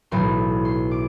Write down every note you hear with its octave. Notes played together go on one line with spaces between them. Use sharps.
B1 A2 E3 C6
C6
D6